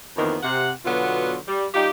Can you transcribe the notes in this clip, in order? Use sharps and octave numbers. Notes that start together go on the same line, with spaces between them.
F2 D#3 E3 A#3 B3
C3 F#5
B2 D3 F#3 B3 F4
G3
G3 D#4 F4 G4